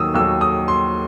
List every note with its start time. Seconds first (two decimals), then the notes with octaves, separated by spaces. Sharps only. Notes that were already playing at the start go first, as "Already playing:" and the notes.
Already playing: D#2 D#3 F#3 D#6 E6
0.14 D#2 D#3 F#3 E6
0.41 D#6
0.68 C6